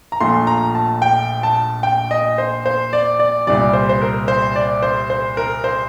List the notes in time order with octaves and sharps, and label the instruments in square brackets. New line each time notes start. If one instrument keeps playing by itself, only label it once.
[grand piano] A#5
A#1 A#2 F3 A3 C6
A#5
A5
G5
A5
G5
D#5
C5
C5
D5
D5
C2 A#2 G3 D5
C5
C5
A#4
C5
D5
C5
C5
A#4
C5